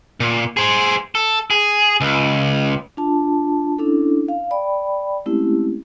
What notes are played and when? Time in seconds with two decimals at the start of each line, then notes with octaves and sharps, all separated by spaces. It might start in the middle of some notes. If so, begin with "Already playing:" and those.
0.20 A#2
0.57 G#4 C5
1.15 A4
1.50 G#4
2.01 C#2
2.97 D4 F4 A5
3.78 C#4 D4 E4 A4
4.28 F5
4.51 D5 G5 B5
5.26 G#3 A3 C4 C#4 E4 G4